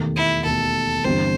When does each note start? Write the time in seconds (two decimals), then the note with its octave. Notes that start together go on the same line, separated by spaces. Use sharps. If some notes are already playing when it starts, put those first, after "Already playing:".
Already playing: E1 D#2 D#3 A3
0.16 E4
0.45 E1 D#2 D#3 A3 A4
1.04 G1 G2 E3 G3 C4 C5